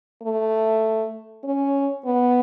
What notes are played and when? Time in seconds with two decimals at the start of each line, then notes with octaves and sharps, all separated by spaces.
0.22 A3
1.44 C#4
2.05 B3